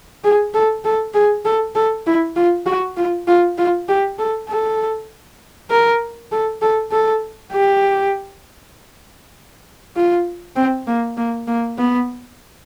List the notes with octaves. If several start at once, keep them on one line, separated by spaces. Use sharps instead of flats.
G#4
A4
A4
G#4
A4
A4
E4
F4
F#4
F4
F4
F4
G4
A4
A4
A#4
A4
A4
A4
G4
F4
C4
A#3
A#3
A#3
B3